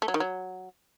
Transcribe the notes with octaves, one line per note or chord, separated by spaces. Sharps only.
A3
F#3
D#3
F#3